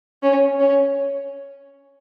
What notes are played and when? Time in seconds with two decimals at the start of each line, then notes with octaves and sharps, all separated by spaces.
0.23 C#4
0.60 C#4